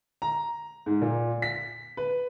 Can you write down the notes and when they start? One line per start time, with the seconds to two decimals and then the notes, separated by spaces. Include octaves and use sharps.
0.22 A#5
0.86 G#2
1.02 A#2
1.42 B6
1.97 B4